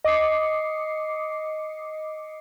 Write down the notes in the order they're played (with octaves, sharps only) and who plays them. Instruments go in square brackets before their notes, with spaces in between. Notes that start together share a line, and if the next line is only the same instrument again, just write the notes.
[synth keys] D#5 D6 D#6 C7 C#7